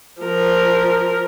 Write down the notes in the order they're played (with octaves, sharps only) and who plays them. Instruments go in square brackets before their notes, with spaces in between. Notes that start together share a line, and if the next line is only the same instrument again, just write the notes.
[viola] F3 A#4